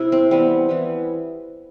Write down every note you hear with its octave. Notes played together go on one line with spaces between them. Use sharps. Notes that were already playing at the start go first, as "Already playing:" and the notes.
Already playing: C3 E4
C4
E3 G3 B3 C4
E3 G3 B3